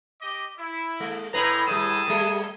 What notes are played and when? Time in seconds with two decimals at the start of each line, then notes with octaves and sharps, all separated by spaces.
0.22 G4 D#5 D6
0.59 E4
1.00 G#3
1.34 A2 G#3 G#4 B4 A#5
1.67 A2 G3 G#4 A5 D#6
2.08 G3 A3